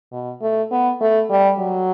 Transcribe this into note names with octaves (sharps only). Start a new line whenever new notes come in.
B2
A3
B3
A3
G3
F#3